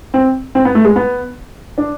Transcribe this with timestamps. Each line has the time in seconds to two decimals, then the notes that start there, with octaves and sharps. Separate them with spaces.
0.14 C4
0.55 C4
0.65 B3
0.75 A3
0.85 G#3
0.96 B3
1.78 D4